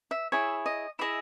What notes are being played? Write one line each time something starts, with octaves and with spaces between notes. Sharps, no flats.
E5
E4 G#4 C#5 E5
D#5
E4 G#4 D#5 E5